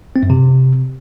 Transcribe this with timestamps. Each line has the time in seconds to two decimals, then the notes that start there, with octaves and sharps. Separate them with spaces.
0.16 C4
0.23 F#2
0.30 C3